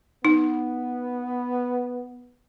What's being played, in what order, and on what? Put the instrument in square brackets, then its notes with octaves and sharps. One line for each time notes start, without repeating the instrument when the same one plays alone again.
[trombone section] B3 [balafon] D#4